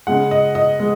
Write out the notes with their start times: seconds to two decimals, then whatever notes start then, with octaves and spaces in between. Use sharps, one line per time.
0.07 C#3 G#3 F#5
0.31 D#5
0.55 D#5
0.80 G#3